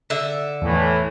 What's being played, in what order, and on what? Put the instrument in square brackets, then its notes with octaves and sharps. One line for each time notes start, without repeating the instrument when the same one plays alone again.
[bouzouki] D3 E5
[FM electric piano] E2 [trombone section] A2 E3